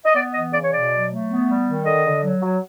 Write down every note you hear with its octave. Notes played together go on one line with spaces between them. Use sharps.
D#5
B3 D5
E3 D#5
C#3 D5
C#5
B2 D5
F#3
A3
B3
G3
D#3
D3 D#5
D3
F#3
F#3